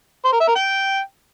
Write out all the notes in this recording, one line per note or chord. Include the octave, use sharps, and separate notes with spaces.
C5
A#4
E5
A#4
G5